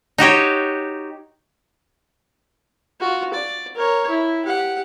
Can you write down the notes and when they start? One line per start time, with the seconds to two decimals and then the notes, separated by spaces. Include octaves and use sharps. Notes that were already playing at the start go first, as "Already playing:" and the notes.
0.18 D#4 F#4 G4 C#5
3.00 F4 F#4
3.34 D5
3.75 A#4 C#5
4.09 E4
4.45 G4 F#5